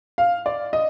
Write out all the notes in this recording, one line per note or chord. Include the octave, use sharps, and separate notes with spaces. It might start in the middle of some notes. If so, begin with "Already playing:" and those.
F5
D5
D#5